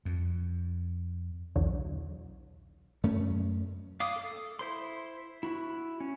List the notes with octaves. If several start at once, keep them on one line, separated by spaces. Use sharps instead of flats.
F2
B1 E2 D3 F#3
F#2 A3 C#4
F5 D6 D#6
A4
E4 C5 C6
E4 F#4
C#4